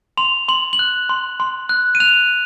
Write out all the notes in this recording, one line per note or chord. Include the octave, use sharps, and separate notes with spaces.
C6 F7
C6 F#7
F#7
F#6
C6
C6
F#6
D#7
F#6 F7